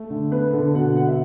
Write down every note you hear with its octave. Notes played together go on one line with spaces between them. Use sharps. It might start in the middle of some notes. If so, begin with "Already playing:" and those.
Already playing: A3
D3
B3 B4
D3 A4
B2 F#5
B3 F#5
E5